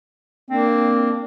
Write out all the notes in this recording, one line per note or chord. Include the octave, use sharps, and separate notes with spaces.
A#3 C4 D4